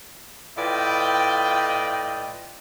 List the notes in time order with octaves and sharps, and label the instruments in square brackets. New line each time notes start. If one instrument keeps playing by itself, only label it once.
[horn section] A2 F4 B4 D5 D#5 G5